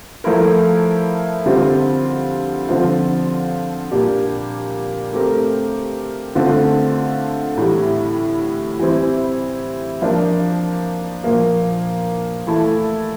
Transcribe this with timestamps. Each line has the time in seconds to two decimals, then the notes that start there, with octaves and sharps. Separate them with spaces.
0.24 F3 A3 E4 A#4
1.46 D3 G3 C4 F4
2.69 D3 F3 C4 F4
3.91 A#2 G3 D4 G4
5.13 A3 C4 G4 A#4
6.35 D3 A3 C4 F4
7.57 A2 E3 G3
8.80 E3 G3 C4 E4
10.02 F3 A#3 D4
11.24 A#2 F3 A#3
12.47 E3 A3 E4 A4